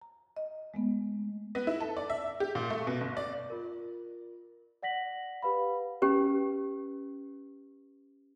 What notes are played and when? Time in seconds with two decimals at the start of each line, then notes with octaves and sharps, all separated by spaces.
0.01 A#5
0.37 D#5
0.74 G#3 A3 B3
1.55 B3
1.67 E4
1.81 A4
1.97 D5
2.10 E5
2.40 G4
2.55 A#2
2.70 A3
2.87 B2
3.01 G1
3.17 D5
3.50 F4 A#4
4.83 D5 F#5 A#6 B6 F#7
5.42 G4 B4 F5 B5
6.02 C#4 G4 B4